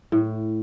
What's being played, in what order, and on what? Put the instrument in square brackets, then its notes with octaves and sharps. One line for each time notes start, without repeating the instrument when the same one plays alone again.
[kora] A2